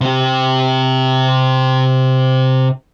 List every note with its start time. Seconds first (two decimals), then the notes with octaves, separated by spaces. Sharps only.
0.01 C3 G4